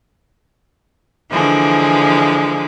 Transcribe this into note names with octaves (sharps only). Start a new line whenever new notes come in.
D3 E3 F3 G#3 A#3